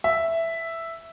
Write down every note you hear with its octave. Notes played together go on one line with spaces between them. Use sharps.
E5